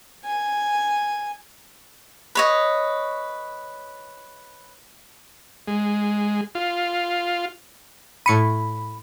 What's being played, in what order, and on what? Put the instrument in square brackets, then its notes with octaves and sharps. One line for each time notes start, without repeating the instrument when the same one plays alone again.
[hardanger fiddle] G#5
[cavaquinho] B4 C#5 D#5
[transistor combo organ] G#3
F4
[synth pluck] A2 C#7 D#7 [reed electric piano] B5